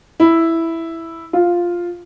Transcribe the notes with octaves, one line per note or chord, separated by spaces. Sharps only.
E4
F4